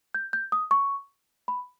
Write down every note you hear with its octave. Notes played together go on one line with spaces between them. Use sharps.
G6
G6
D#6
C#6
B5